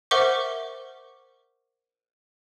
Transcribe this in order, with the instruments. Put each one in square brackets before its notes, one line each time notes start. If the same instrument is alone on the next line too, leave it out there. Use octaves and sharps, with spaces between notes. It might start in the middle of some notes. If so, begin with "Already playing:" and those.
[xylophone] A#4 C5 E5 F#5 C#6 D6